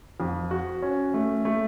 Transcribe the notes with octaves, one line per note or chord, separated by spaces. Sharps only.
F2
F#4
C#4
A3
A3